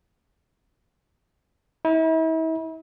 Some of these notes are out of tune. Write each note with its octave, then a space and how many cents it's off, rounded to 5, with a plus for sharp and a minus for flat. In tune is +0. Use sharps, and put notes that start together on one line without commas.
E4 -40